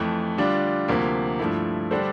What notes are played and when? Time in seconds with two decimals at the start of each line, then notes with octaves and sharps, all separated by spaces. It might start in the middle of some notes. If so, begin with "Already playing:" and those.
Already playing: F2 E3 A3
0.38 D3 G3 D4 F4
0.88 D2 C3 F3 A#3
1.39 G2 F3 A3 E4
1.91 D3 G3 D4 A4 C5